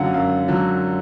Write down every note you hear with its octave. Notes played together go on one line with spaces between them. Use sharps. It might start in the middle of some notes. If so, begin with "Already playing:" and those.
Already playing: F#2 D3 F#3 F5 F#5
F#2 F5
D3 F#3